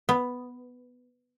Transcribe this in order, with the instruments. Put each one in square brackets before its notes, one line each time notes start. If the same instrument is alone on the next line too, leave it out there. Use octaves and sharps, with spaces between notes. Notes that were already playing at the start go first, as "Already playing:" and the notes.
[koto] B3